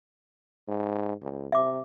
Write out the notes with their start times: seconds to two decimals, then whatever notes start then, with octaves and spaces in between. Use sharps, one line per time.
0.68 G#2
1.22 C#2
1.52 C3 E5 D6